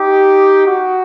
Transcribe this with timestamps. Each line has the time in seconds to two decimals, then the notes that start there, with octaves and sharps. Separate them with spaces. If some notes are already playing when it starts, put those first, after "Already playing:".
Already playing: D#4 G4
0.66 F#4